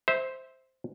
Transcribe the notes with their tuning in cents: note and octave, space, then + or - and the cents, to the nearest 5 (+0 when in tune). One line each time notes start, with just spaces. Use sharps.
C5 +0 E5 -15